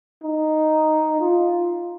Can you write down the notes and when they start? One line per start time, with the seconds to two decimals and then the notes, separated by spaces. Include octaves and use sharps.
0.23 D#4
1.20 F4